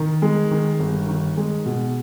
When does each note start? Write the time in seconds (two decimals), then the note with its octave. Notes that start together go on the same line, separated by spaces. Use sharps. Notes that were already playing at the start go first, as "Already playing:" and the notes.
Already playing: D#3
0.22 G#3
0.51 D#3
0.79 G1
1.08 D#3
1.37 G#3
1.66 B2